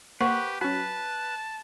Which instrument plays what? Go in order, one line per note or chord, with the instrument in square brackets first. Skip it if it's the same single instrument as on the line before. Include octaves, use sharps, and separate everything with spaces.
[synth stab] A#3 C5 [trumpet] G4 [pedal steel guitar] B4 [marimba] F#5 C#6
[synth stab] F#3 C#4 [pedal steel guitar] B4 [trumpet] A5